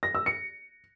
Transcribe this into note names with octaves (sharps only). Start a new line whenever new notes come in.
A#6
E6
C#7